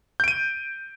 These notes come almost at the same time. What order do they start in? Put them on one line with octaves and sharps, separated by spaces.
G6 D7 D#7